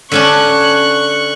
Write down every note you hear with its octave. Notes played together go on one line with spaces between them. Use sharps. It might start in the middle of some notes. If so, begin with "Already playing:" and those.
D3 C#4 D4 C#6 F#6